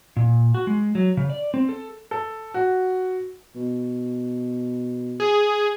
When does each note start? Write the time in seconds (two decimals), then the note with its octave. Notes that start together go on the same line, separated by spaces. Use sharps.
0.17 A#2
0.54 F#4
0.67 G#3
0.95 F#3
1.17 C#3
1.30 D5
1.54 C4
1.69 A4
2.11 A4
2.54 F#4
3.55 B2
5.20 G#4